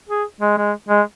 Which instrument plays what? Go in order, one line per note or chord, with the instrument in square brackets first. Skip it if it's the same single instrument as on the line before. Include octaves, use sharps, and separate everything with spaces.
[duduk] G#4
G#3
G#3
G#3